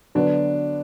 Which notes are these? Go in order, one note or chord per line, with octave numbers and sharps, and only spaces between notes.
D3 F#3 B3 D4 F#4 B4 D5